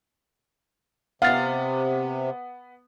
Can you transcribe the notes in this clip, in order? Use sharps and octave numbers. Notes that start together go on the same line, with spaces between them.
C3 B3 F5 A6